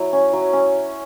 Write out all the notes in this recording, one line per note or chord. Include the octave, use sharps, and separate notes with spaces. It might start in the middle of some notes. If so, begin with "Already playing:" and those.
Already playing: F#3 E4
C#4
F#3
C#4